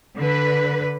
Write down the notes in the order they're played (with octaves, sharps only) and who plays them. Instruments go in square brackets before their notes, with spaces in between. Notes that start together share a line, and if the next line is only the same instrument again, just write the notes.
[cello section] D3 B4